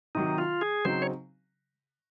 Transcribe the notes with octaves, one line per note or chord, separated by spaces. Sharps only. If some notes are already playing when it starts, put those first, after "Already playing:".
C3 D#3 F#3 D#4
F4
G#4
C#3 F#3 C4 D#4 C5
C#5